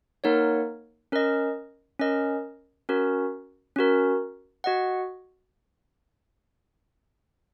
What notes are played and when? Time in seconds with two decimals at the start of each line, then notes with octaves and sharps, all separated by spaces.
0.24 A#3 D#4 A#4 C#5 F#5
1.12 C#4 A#4 D#5
2.00 C#4 A#4 D#5
2.89 C#4 F#4 A#4
3.76 C#4 F#4 A#4
4.64 F#4 D#5 F#5